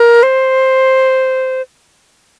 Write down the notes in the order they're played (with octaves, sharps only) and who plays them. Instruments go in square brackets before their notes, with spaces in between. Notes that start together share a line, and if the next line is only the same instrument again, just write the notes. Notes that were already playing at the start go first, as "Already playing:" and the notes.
Already playing: [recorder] A#4
C5